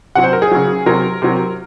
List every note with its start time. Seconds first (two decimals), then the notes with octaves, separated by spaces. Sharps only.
0.15 C3 F#3 F#5
0.24 C5
0.33 A#4
0.42 G#4
0.51 C#3 F#3
0.86 C3 F#3 A#4
1.22 C3 F#3